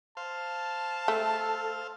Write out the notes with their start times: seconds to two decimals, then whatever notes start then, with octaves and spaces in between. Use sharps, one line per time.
0.17 C5 F5 A5
1.08 A3 A4